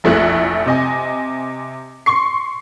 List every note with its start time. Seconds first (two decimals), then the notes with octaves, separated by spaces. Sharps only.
0.04 F1 A#1 A3 E4 F#6
0.66 C3 D#5 G#5
2.06 C6 C#6 C7